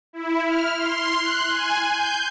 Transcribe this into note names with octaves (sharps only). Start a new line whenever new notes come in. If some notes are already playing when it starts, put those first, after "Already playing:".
E4
F6
C6
F#6
G#5
G6